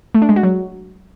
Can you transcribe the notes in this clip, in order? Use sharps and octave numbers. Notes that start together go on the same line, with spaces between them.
A3
D4
G#3
F#4
F#3